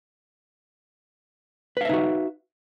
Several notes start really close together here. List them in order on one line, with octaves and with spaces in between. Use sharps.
B4 F5 E5 D#4 F#4